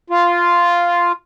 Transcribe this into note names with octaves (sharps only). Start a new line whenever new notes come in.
F4